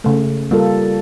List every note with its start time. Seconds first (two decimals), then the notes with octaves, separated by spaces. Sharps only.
0.04 C#3 A3
0.51 G3 A#3 F4 A4